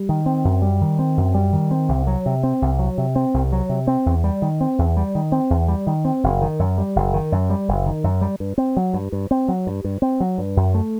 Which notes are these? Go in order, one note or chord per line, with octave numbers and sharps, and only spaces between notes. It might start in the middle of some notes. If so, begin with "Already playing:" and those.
Already playing: G3
D#3
C4
F#2
G3
D#3
C4
F#2
G3
D#3
C4
C2
F#3
C3
C4
C2
F#3
C3
C4
C2
F#3
C3
C4
E2
G3
D#3
C4
E2
G3
D#3
C4
E2
G3
D#3
C4
F#1
D#3
F#2
G3
F#1
D#3
F#2
G3
F#1
D#3
F#2
G3
G2
C4
F#3
G2
G2
C4
F#3
G2
G2
C4
F#3
G2
F#2
A3